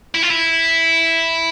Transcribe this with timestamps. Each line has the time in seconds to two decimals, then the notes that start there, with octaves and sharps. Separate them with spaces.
0.14 E4
0.22 F4
0.30 E4